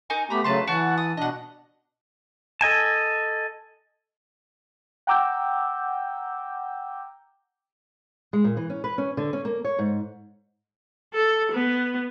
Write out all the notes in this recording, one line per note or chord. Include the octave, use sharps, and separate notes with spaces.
D#4 A#4 G#5
A3 B3 G4 A#5 B5
C#3 F#3 A3 B4 A5 C6
E3 F#4 F#5 A5
D#6
B2 D4 D#5 F#5
A4 D#5 G#5 A5
F#5 G5 A#5 D6 E6 G6
G#3
A#2
E3
C#4
B4
C#4
D3
C#4
A#3
C#5
G#2
A4
B3